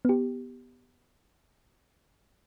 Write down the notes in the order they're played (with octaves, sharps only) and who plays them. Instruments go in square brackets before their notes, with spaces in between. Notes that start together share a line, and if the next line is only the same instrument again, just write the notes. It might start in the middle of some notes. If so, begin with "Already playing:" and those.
[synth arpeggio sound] B3 G4